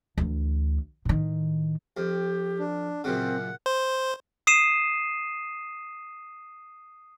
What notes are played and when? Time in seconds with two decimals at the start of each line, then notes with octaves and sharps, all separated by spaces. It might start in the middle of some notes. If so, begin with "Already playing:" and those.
0.18 D2 E3
1.05 A2 D#3
1.97 F2 G4
2.59 D4
3.04 F#2 A#2 C#3 C4 F#5
3.66 C5
4.47 D#6 C7 D#7 E7